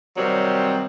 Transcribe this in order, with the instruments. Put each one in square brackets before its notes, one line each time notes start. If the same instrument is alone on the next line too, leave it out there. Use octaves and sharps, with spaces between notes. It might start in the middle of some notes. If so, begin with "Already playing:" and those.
[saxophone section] C3 D#3 F#3 G3 C4